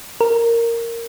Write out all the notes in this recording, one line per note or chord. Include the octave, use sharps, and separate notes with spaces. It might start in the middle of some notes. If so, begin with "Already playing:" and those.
A#4